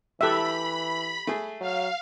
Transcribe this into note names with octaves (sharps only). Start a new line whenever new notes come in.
E3 E4 G4 A4 E5 B5 F#6
A3 G#4
F#3 F5